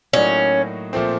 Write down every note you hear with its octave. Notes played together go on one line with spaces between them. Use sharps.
A2 F#3 A#3 C#4 D#4 F#4
A#2 F3 A3 C4